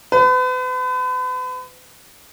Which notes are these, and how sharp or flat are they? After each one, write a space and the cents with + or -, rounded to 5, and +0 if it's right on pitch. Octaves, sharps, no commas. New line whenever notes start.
B4 +40